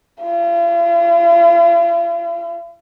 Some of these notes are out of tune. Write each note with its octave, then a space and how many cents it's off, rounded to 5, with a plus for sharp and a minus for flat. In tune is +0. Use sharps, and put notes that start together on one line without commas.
F4 -45